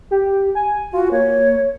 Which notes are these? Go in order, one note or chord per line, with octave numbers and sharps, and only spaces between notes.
G4
G#5
F4 F#4
A#3 C#5